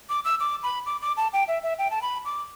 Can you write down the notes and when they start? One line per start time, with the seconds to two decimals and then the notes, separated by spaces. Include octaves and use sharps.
0.09 D6
0.25 E6
0.40 D6
0.63 B5
0.86 D6
1.02 D6
1.17 A5
1.33 G5
1.48 E5
1.63 E5
1.79 G5
1.91 A5
2.02 B5
2.25 D6